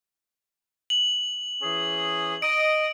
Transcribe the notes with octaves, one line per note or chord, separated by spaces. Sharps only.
F#7
E3 C#4 G#4
D#5 D7